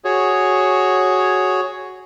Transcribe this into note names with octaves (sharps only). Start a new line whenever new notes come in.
F#4 G#4 C#5